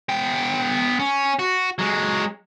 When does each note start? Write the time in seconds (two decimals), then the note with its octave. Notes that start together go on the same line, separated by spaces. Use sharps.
0.09 B3 G5
1.00 C#4
1.39 F#4
1.79 F#3 G#3